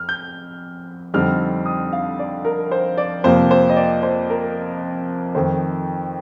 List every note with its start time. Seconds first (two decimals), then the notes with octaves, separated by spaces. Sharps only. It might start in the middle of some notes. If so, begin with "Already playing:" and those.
Already playing: F2 F6
0.09 G6
1.14 F2 D3 G3 C4 D#4 F6
1.66 D#6
1.93 F5
2.19 D5
2.45 A#4
2.71 C5
2.97 D5
3.24 F2 C3 F3 A#3 C5
3.51 C5
3.70 D#5
3.76 D5
4.03 C5
4.30 A#4
5.35 F2 D#3 A3 C5